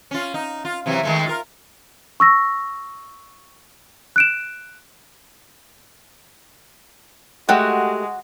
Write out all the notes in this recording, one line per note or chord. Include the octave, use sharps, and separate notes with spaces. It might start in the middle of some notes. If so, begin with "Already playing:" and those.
C#4 F4
D#4
F4
C3 E3 F#3
D#3 G#3 A3
F4 A#4
C#6 E6 A#6
F#6 D7 E7
G#3 A3 F#4 G4